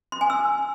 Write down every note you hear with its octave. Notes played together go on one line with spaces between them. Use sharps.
C6
G#5
E6